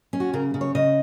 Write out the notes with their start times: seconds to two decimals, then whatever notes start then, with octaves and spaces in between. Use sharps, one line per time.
0.13 C#4
0.20 F#4
0.33 C#3 A#4
0.54 C#3
0.61 C#5
0.75 C#3 D#5